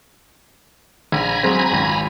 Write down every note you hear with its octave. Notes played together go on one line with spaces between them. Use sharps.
A#1 G#5 A#5 B5
F#3 G#3 C4
G#1 C#2